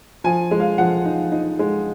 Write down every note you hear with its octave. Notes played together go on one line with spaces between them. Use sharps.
F3 G#5
G#3
F5
F3 F#5
D#4
D#4
G#3